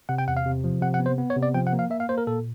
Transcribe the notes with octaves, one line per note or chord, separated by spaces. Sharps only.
C3 F#5
G5
E2 F#5
F5
C3
F3
C3 F#5
F#5
B3
C5
B3
C#5
C3
D5
F3 G5
F#5
A#3
F5
A#3 E5
F5
A#3 C5
A#4
A#2 A4